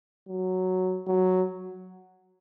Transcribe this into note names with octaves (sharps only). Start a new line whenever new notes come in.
F#3
F#3